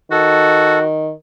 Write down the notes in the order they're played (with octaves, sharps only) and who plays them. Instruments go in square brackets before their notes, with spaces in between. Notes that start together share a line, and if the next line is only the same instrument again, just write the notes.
[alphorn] D#3 [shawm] F#4 [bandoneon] A4